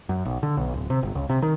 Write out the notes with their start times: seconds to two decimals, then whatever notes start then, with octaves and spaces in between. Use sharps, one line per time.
0.09 F#2
0.25 B1
0.43 D3
0.57 B1
0.74 D1
0.90 C3
1.03 G1
1.15 C#2
1.29 C3
1.42 D#3